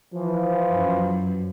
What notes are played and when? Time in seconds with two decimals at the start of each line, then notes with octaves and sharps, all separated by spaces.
0.14 E3 F3
0.72 F#2